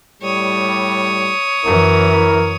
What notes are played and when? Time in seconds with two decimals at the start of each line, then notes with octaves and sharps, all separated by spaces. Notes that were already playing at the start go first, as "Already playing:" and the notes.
0.22 A2 G3 C#5 D#6
1.64 F#2 E3 E4 A#4